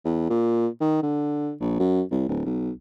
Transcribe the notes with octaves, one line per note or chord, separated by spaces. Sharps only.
E2
A#2
D#3
D3
A#1
F#2
C2
D1
B1